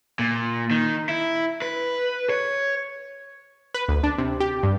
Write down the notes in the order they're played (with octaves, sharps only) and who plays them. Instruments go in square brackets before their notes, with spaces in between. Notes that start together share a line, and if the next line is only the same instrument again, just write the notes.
[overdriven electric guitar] A#2
D#3
E4
B4
C#5
[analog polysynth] B4
D2
D4
C3
G4
G2